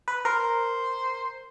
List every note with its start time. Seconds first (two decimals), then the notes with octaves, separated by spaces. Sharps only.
0.08 B4
0.25 A#4 C5